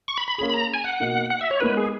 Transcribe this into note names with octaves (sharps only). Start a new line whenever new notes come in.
C#6
B5
B5
A#3 C#4 G#4 B5
B5
A#5
G#5
F#5
B2 A#3 D#4
F#5
E5
C#5
G#3 B3 D#4 A#4 B4
G#4